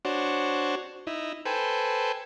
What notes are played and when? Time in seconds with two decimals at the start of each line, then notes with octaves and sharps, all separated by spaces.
0.05 D4 F#4 C5 C#5
1.07 D#4 E4
1.45 A4 B4 C5 G5 G#5